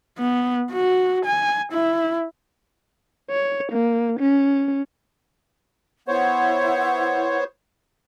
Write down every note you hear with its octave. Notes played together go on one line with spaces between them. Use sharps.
B3
F#4
G#5
E4
C#5
A#3
C#4
B3 E4 C5 C#5 F#5